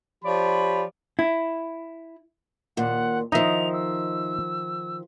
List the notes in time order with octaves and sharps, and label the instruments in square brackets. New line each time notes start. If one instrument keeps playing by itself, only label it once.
[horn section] F3 G4 C#5 D5 B5
[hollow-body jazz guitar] E4
[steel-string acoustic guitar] D#2 A#2 [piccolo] F#5
[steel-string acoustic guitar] D#3 F3 [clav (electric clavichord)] D#4 D#5 E5 [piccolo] F7
[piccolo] E6